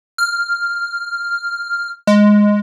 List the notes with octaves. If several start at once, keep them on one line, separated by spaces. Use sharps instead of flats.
F6
G#3